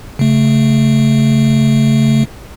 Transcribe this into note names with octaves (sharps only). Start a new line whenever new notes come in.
C#3 A3